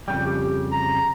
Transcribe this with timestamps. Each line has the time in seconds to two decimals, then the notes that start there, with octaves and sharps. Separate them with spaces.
0.08 F2 C#3 G3 G5
0.26 G4
0.72 A#5